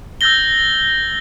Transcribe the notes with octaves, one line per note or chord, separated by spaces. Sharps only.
E6 F#6 G6 A6 A#6 G7